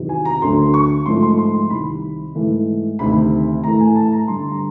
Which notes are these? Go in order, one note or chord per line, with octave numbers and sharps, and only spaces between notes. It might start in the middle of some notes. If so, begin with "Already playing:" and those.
Already playing: E2 C3 D#3 F#3
G#5
A#5
D2 D3 F#3 A3 C6
C#6
G#2 F3 A3 C6
C6
C6
C6
C2 C3 D#3 B5
G#2 E3 A3
D2 C3 D#3 B5
A2 E3 A3 A#5
G#5
A5
A#5
G2 D3 G3 C6
A#5